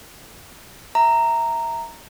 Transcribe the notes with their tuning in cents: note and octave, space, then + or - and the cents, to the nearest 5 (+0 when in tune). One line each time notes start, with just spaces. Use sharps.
E5 +0 A#5 -10